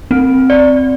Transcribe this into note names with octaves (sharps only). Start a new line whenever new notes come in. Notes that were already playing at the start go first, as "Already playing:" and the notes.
C4
D5